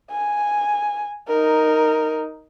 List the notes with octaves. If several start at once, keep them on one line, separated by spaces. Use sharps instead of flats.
G#5
D#4 A#4